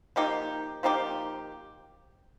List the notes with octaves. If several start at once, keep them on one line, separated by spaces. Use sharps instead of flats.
F3 A#3 D#4 G4
F3 A#3 D#4 G4